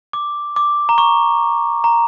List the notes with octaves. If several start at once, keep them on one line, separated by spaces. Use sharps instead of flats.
D6
D6
A#5
C#6
A#5